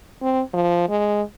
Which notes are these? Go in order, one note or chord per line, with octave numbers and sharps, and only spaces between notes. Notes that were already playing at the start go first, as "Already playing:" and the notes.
C4
F3
G#3